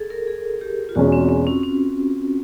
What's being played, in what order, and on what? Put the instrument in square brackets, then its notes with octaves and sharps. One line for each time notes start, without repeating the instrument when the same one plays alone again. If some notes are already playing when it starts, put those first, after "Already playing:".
Already playing: [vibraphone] G#4 A4
A#4
G#4
G4
F4
[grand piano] E2 B2 G#3 C#4 [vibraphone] F#4
[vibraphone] C4
C4
C#4
C#4